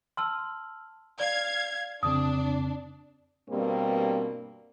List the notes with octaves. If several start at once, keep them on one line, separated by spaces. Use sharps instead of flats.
A5 C6 E6 F6
D5 F5 G#6
F2 C#3 C4 D4 D#6
G2 B2 G3 A#3 C4